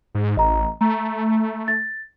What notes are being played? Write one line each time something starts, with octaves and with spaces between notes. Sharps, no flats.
G#2
A1 D#5 A#5
A3 A#5
A6